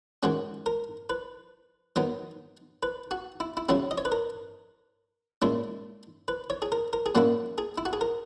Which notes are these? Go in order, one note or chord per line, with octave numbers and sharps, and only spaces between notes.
D#3 G#3 C#4 F#4
A#4
B4
D#3 F#3 B3 D#4
B4
F#4
E4
E4
C#3 F#3 C#4 E4 F#4
D#5
C#5
B4
A#4
A#2 G#3 C#4 E4
B4
C#5
G#4
A#4
A#4
G#4
A#2 F#3 A#3 C#4 E4 F#4
G#4
E4
F#4
G#4
A#4